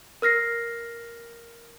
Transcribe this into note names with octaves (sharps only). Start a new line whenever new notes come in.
A#4 F6 A#6 C7